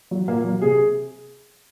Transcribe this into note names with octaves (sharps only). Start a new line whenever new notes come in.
F#3
A#2 A#3
F#3
C3 G#4